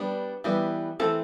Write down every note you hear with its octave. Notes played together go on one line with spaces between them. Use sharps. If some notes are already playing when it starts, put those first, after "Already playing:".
Already playing: G3 B3 D4
E3 G3 B3
E3 A3 C4 A4